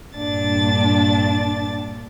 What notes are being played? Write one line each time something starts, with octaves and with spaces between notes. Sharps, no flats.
G2 A#2 D4 A6